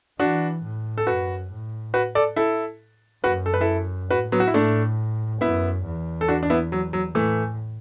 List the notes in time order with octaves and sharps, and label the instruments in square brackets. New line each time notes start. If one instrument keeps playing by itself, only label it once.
[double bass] E3 [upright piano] D4 F#4
[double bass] A2
[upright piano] A4
[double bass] F#2 [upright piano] F#4 B4
[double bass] A2
[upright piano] F#4 B4
A4 D5
E4 A4
[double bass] F#2 [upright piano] F#4 B4
[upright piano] A4
B4
E4 A4
[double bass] A2 [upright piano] F#4 B4
[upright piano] F#3 B3
F#4
E4
[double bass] A2 [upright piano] A3 D4
[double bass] F#2 [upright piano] B3 E4
[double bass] E2
[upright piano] A4
D4 F#4
D4
B3 E4
F#3
F#3
[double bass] A2 [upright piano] E3 A3